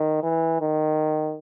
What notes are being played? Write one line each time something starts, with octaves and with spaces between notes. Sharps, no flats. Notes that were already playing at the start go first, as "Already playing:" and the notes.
Already playing: D#3
E3
D#3